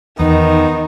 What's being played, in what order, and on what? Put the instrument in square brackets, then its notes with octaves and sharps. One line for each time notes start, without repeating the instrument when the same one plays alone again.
[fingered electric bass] E2 [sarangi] D#3 [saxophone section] B3 D#4